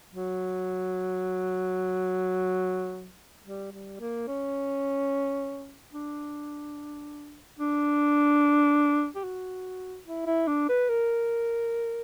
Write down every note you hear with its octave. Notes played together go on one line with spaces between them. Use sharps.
F#3
G3
G3
A#3
C#4
D4
D4
G4
F#4
E4
E4
D4
B4
A#4